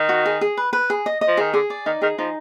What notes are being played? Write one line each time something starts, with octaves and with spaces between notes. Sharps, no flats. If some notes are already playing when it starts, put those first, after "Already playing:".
Already playing: D#3
F#4
G#4
G#4
B4
B4
G#4
D#5
D#5
F3
D#3 G#4
D3 G#4
D5
D#3 D#4
D#3 G#4
F3 D#4